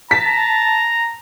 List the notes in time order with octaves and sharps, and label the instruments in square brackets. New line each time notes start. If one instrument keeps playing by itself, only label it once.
[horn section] A5 [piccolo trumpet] A#5 [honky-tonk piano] B6